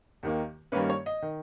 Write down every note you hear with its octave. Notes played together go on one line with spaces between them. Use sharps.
D#2 D#3 A#3
G2 D#3 A#3 C#4 B4
C#5
D#5
D#3